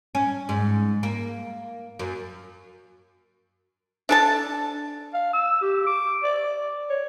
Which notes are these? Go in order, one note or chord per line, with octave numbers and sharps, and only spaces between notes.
C#4
G#2
A#3
F#2
D4 A4 A5
F5
E6
G4
D6
D5
C#5